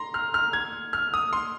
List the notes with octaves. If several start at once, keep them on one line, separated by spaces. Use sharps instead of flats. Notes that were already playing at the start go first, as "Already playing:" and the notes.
Already playing: A#5 C6
F6
F6
G#6
F6
D#6
C6